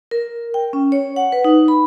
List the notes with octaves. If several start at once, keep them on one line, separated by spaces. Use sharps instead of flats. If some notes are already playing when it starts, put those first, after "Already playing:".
A#4
G5
C#4
C#5
F#5
B4
D#4
B5